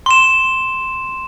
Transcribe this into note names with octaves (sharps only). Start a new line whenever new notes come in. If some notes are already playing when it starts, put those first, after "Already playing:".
C6 E7